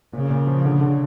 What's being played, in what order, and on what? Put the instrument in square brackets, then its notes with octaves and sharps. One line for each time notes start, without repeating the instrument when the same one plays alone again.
[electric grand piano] A#2 [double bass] C#3
[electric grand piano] A#2
F3
D3
D3